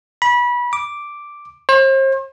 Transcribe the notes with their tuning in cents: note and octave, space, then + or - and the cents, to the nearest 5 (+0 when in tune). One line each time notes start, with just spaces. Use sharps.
B5 -25
D6 +0
C5 +40